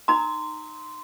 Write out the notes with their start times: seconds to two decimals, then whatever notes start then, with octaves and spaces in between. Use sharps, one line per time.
0.08 D#4 A#5 C6